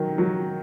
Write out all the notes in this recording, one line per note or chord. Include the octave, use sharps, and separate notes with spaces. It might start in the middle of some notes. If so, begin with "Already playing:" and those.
Already playing: D#3 F#3
F#3